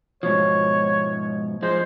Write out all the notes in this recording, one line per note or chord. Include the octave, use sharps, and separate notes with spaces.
G#2 B2 F3 C#5
F3 G#3 C5